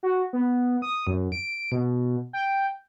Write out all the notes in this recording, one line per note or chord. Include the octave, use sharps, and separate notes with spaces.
F#4
B3
D#6
F#2
D7
B2
G5